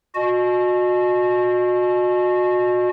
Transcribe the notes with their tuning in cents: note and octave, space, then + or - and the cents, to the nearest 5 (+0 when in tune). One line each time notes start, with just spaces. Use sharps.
F#4 -30 D#5 -30 A5 -45